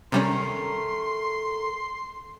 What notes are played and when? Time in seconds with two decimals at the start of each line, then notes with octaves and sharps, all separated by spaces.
0.12 C3 D#3 G3 A3 C#4 A#4 C6